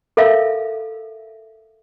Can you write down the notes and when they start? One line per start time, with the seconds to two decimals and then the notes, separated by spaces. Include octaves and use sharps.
0.17 A4 A#4 E5 F5